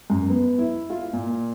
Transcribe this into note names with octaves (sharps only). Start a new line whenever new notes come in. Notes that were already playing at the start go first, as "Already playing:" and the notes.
F#2
B3
E4
F4
A#2